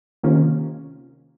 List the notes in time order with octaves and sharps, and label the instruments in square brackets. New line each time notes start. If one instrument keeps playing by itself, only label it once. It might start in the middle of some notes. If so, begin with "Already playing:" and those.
[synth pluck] C3 D#3 A#3 C#4 F4